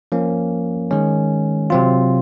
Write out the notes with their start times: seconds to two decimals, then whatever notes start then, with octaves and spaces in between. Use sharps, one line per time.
0.12 F3 A#3 C#4
0.91 D#3 G#3 C#4
1.70 C3 F#3 C4 F4